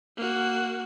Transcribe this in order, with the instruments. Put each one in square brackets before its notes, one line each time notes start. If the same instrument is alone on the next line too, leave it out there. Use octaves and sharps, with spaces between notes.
[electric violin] A#3 F#4